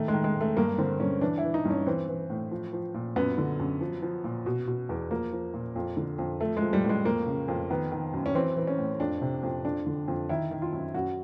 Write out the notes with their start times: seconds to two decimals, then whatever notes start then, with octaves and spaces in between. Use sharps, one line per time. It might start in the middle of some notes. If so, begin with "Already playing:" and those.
Already playing: A2 D#3 A3
0.08 G#3
0.14 D#3
0.24 G#3
0.35 G#2
0.41 A3
0.57 G2 A#3
0.78 D3 C4
1.00 G2 C#4
1.21 E3 D4
1.38 E4
1.44 E3
1.54 D#4
1.65 G2 C#4
1.87 E3 C4
2.08 E3
2.30 A2
2.51 F3
2.73 F3
2.95 A#2
3.16 F#2 B3
3.38 D3
3.60 F#2
3.81 F3
4.02 F3
4.24 A#2
4.46 B2
4.67 B2
4.89 E2
5.11 F3 A#3
5.33 F3
5.54 A#2
5.76 F2
5.97 D3
6.19 F2
6.40 F3 A3
6.57 G#3
6.62 F3
6.73 G3
6.84 A2
6.89 G#3
7.05 F2 A#3
7.27 C#3
7.48 F2
7.70 D#3 B3
7.92 D#3
8.14 F#2
8.26 C#4
8.35 E3 C4
8.57 E3
8.67 C#4
8.78 A2
9.00 F2 D4
9.22 C3
9.43 F2
9.65 F2 D4
9.87 D3
10.08 F2
10.29 D#3 E4
10.51 D#3
10.62 F4
10.73 F#2
10.94 F#2 F#4